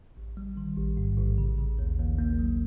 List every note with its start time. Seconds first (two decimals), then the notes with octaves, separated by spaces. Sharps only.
0.17 A1
0.37 G3
0.57 D#3
0.77 A1
0.97 G#2
1.18 A1
1.38 C#3
1.58 C#3
1.79 D#2
1.99 D#2
2.19 A#3
2.39 F#3